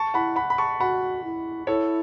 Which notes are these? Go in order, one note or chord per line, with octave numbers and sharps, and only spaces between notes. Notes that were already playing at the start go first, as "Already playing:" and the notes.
Already playing: A5 C#6
E4 F#5 B5
F#5 B5
B5
A5 C#6
F#4 F#5 B5
E4
E4 A4 C#5